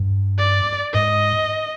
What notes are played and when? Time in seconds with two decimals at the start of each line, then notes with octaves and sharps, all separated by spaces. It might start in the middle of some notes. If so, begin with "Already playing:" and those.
Already playing: G2
0.39 D5
0.94 G#2 D#5